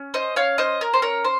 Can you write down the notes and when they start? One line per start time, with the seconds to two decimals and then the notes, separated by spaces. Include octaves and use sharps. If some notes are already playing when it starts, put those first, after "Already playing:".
Already playing: C#4
0.14 C5 D#5
0.36 C#5 F5
0.58 C5 D#5
0.81 A#4
0.94 C5
1.02 A#4 C#5
1.25 C5